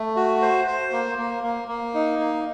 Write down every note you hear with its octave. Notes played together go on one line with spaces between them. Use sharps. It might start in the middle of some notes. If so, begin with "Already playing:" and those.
Already playing: A3
F#4
C5
C5
A#3
A#3
A#3
A#3
D#4
A#3